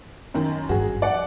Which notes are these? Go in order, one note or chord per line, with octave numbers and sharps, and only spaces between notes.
F#2 D#3
G#1 G2 F#4 G#4
F2 D5 F#5